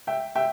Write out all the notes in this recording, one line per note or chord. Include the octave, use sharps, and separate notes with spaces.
E5 G5
E5 G5